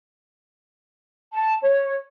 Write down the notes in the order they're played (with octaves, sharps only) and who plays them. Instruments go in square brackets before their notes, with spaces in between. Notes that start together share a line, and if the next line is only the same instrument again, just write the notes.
[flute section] A5
C#5